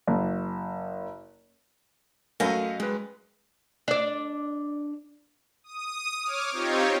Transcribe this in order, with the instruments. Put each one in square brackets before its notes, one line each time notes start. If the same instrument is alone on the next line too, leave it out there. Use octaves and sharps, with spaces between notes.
[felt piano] F#1
[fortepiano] F#2 A#4 [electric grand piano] A3 [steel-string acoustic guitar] D#5 F5
[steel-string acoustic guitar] G2 [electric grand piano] G#3 B4
[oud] D4 D5
[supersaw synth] D#6
C#5 D6 F6
C4 D#4 F4 G4 C#5